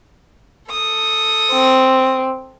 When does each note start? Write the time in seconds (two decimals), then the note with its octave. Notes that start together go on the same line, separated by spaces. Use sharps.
0.70 A4 D#6
1.52 C4